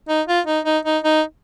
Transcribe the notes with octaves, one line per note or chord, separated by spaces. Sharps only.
D#4
F4
D#4
D#4
D#4
D#4